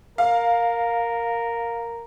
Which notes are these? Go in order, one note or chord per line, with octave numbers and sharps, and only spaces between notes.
A#4 F5